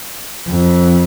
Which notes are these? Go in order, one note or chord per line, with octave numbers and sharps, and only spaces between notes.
F2